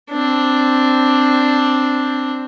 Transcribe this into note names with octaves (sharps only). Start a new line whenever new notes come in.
C4 D4